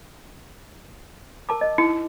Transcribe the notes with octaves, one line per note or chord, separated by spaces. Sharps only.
A#4 A5 D6
D#5
D#4 E4